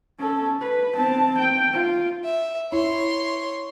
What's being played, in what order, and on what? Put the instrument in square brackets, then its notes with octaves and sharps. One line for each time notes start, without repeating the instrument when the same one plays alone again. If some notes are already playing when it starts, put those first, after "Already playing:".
[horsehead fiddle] C#4 A4
B4
C4 A5
G5
F4
[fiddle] E5
[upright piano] E4 [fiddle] C#5 C6